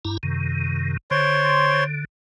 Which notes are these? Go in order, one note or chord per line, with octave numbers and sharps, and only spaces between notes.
G2 E4 A#5
F#2 C3 D#3
D3 C5 C#5 C6